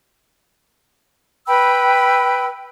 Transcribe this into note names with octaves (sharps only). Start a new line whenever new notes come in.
B4 G5 B5 E6